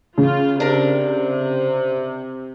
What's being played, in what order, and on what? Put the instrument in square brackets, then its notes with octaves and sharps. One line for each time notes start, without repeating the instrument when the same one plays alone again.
[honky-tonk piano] C#3 [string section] F4
[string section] C3 [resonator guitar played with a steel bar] D4 A#4